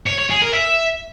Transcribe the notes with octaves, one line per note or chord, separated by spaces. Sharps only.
C#5
C#5
G#4
A#4
E5